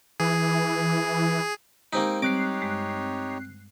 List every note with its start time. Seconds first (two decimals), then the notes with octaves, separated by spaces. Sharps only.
0.20 E3 G#4
1.93 G#3 A#3 C4 D#4 G4
2.22 G3 C4 D#4 G4 C#5 D6 F#6 C7
2.62 G2 G#3